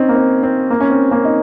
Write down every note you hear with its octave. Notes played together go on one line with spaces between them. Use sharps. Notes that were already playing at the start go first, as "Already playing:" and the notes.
Already playing: C4 C#4 D#4
A#3
C4
C4
A#3
C#4
C4
A#3 C#4
D#4